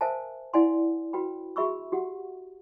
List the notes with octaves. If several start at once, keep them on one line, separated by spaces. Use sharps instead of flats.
A#4 C5 E5 F5 G#5 A5
E4 D5 F5 F#5 G#5 C6
F#4 B4 G5 B5
F#4 G#4 E5 B5 C#6 E6
F#4 G4 F#5